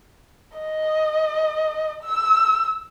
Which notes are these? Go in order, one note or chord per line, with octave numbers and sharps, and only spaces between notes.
D#5
E6